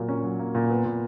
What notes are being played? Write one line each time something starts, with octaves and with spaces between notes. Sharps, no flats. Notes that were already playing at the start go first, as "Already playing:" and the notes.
Already playing: A#2 F#3 A#3
C#4
F#3
A#3
A#2
B3
A#2